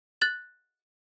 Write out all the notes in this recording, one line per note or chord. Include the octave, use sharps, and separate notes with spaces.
F#6 A6 F#7